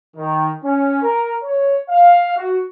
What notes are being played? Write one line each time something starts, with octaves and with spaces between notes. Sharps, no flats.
D#3
C#4
A#4
C#5
F5
F#4